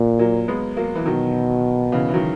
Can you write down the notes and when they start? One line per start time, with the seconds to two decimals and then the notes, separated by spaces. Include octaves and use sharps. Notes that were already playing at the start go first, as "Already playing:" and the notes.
Already playing: A#2
0.19 F#3 A#3
0.48 G#3 B3
0.77 F#3 A#3
0.95 E3
1.06 B2 D#3 F#3
1.92 C#3 E3
2.09 E3
2.14 D#3 F#3